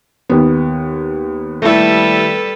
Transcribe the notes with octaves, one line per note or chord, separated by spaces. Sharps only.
D#2 B3
G3 A3 E4 A4 B4